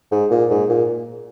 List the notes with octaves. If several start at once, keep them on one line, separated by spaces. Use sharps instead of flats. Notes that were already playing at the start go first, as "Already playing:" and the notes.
G#2
A#2
G#2
A#2